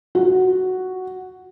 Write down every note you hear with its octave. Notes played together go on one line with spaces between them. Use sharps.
F#4